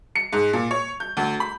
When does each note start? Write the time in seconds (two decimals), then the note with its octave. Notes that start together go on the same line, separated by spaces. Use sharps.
0.15 C#7
0.32 G#2
0.53 A#2
0.71 C#5
1.00 G6
1.17 D2
1.40 B5